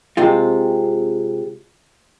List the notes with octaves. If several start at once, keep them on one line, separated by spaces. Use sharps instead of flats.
C3 G#3 C4 F4